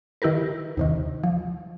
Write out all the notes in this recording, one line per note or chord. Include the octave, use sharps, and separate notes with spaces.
D#3 E4 G4 A#4 B4
D#2 C3 D#3
F3